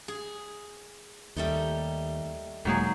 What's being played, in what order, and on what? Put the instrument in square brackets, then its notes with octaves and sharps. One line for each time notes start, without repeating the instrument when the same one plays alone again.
[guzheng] G#4
[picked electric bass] D#2 [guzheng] G3 A3 D#4
[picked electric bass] E1 G#3 A#3 [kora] D#3 F#3 G#4